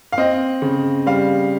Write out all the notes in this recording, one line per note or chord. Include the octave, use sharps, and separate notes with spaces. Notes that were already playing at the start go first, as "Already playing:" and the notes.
F5
C4 D#5
C#3
G3 F5